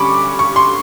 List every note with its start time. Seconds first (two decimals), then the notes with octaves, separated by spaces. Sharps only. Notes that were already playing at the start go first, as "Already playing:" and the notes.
Already playing: D3 G3 C#4 B5 C#6 D6
0.39 C#6
0.56 C6